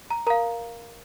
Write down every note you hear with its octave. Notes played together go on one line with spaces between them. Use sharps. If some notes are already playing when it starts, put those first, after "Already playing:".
A#5
A#4 F5 A#5